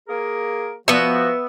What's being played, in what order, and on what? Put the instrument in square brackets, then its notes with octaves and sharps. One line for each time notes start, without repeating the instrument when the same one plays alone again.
[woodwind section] A#3 G#4 A#4
[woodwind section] F3 F#4 [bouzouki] B3 E5